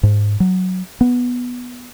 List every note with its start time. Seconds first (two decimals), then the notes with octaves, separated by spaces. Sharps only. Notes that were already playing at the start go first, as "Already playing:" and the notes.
0.03 G#2
0.40 F#3
1.01 B3